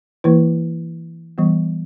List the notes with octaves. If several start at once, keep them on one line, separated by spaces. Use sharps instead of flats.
E3 A#3 E4 B4
E3 G3 B3